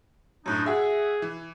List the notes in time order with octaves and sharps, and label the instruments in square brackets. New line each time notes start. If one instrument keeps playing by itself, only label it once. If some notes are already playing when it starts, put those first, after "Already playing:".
[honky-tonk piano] F#2 A2 [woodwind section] D4 D#4
[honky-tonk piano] F#4 E5 [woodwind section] G#4
[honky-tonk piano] E3